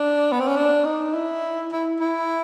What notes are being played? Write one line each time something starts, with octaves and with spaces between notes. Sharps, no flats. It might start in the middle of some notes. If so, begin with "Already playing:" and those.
Already playing: D4
B3
C4
C#4
D4
D#4
E4
E4
E4